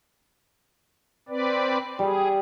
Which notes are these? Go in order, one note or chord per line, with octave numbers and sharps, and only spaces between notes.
C4 B4 D5
G3 G#4